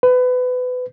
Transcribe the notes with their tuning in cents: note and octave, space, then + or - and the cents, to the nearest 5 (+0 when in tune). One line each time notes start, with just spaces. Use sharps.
B4 +25